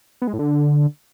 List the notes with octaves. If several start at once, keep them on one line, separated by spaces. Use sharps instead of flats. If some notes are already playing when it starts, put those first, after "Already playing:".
B3
G#3
A2
D3